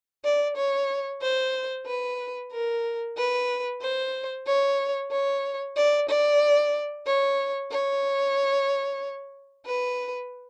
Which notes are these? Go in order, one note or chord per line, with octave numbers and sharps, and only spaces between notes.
D5
C#5
C5
B4
A#4
B4
C5
C#5
C#5
D5
D5
C#5
C#5
B4